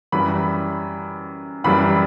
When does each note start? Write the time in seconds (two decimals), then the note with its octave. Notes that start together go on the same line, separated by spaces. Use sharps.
0.12 F#2 E3 G3 B5
1.64 F#2 E3 G3 B5